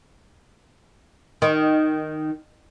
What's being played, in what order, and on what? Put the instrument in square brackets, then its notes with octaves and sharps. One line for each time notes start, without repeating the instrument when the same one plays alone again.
[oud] D#3